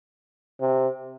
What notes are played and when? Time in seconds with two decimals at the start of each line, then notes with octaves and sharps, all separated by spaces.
0.60 C3